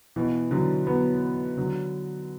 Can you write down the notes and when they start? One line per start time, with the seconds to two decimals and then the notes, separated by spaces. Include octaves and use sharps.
0.16 B2 E3
0.51 D3 F#3
0.87 F#3 B3
1.57 D3 F#3